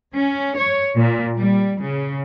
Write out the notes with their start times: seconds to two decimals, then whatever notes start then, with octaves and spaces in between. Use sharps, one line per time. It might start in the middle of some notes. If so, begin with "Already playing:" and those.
0.14 C#4
0.57 C#5
0.95 A#2
1.36 G3
1.82 C#3